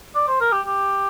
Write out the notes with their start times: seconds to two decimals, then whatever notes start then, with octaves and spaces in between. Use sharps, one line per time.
0.15 D5
0.28 C5
0.40 A#4
0.52 G4
0.66 G4